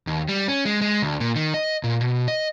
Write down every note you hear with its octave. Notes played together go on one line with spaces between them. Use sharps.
D#2
G3
C#4
G#3
G#3
D2
A#2
D#3
D#5
A#2
B2
D#5